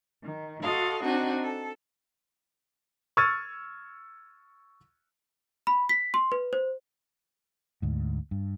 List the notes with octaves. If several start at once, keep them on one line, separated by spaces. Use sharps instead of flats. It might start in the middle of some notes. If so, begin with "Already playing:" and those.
D#3
F#4 A4 D#5 F5 C6
C4 D4 D#4 F#4 G#5
A4
C#6 E6 F6 G#6 A6 D#7
B5
B6
C6
B4
C5
D2 G#2
G2